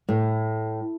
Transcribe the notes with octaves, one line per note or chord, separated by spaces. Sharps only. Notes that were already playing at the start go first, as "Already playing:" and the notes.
A2